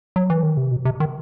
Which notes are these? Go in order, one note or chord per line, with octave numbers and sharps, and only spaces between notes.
F#3
E3
D#3
C3
B2
C3
D#3